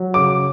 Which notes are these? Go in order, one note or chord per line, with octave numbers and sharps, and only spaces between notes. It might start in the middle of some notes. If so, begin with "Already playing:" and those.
Already playing: F#3
C#3 D6